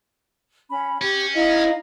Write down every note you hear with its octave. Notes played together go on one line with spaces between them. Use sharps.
C#4 B5
C#4 G4
D#4 E4 D#5 F5